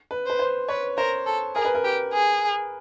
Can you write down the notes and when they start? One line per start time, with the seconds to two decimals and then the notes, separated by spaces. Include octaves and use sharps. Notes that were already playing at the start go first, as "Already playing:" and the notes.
0.11 B4
0.26 B4 C5
0.39 C5
0.69 B4 C#5
0.97 A#4 C5
1.26 A4
1.55 G#4 A#4
1.65 B4
1.75 A#4
1.84 G4
2.13 G#4